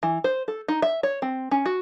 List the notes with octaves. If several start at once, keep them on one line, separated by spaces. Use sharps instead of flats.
E3
C5
A4
D#4
E5
C#5
C4
C#4
F#4